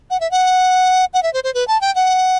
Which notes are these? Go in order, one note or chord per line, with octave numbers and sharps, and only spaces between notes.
F#5
E5
F#5
F#5
E5
C5
C5
B4
A5
G5
F#5